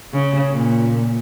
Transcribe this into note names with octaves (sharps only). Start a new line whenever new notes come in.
C#3
A#2